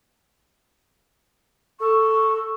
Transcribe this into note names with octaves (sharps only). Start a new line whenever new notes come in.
A4 C#6